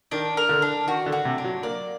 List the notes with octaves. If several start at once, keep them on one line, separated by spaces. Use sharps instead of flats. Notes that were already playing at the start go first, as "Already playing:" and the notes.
D#3 D4
A#4
D3
D4
D#3 F#4
D3
F#4
C3
D4
F#3
A#3 D5